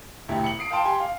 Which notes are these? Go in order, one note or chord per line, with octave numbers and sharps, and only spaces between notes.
E1 D2 E4 G4
C#7 F#7
D#6 C7 D7
F5 G5 A5 C6 D7
G4 G#5 C6
F5